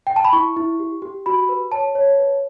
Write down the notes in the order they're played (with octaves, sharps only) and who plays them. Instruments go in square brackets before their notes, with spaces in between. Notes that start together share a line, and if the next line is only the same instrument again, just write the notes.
[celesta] G5
A5
B5
E4 C#6
E4
G4
G4
F#4 B5
B4
C#5 A5
C#5
B4